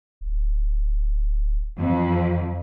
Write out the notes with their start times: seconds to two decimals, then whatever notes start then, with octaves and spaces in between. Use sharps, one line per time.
0.21 D1
1.78 F2 E3